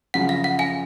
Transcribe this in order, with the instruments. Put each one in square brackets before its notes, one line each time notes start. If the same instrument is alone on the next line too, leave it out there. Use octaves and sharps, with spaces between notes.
[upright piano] F#2 C#3 F3 [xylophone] F#5
[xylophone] F5
F#5
F5 G#5